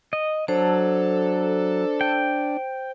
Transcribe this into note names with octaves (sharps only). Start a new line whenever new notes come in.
D#5
F#3 D4 A4 C5
G5